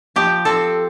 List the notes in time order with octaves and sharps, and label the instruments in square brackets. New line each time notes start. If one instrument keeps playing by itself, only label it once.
[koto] F3 G4
C4 A4